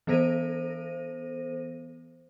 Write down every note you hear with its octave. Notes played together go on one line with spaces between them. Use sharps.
E3 B3 A4 C5 A#6 D#7